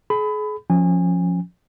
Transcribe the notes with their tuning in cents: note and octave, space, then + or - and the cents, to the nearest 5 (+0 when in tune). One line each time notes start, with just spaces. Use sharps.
G#4 +35 B5 +20
F3 +15 C#4 +0 G#5 -25